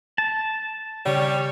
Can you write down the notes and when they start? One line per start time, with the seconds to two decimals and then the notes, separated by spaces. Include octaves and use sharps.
0.18 A5
1.06 C#3 G3 C#5